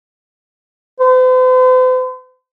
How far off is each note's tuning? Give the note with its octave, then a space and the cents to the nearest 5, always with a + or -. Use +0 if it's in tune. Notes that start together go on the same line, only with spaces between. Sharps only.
C5 -45